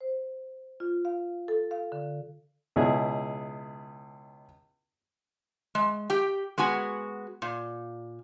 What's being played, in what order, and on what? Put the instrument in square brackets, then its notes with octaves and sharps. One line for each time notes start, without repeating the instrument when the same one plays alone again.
[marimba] C5
F4
F5
A4
F5
D3
[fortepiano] C#2 B2 E4 G#4
[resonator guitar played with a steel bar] G#3
G4 G5
G#3 B3 F#4 G#5
A#2